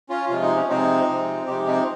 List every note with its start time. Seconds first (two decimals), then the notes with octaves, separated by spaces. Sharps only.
0.09 C#4 F4
0.29 C3 F3 G#3 F4
0.42 D#4
0.55 C#4
0.69 C3 F3 G#3 C4 D#4
1.08 C3 F3 G#3
1.47 C3 F3 G#3 D#4 G4
1.67 C4 D#4